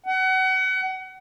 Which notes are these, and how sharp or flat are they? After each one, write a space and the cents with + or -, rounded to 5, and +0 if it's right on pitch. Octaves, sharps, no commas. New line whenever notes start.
F#5 +30